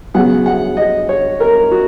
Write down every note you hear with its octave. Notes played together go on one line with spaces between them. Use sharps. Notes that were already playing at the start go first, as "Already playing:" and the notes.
C#3 F#3 B3 F#5
F#5
D#5
C#5
A#4
F#4